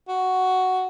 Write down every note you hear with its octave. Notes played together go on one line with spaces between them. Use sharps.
F#4